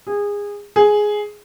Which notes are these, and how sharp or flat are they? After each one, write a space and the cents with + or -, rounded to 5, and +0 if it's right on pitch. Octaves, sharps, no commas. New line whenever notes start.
G#4 -25
G#4 +5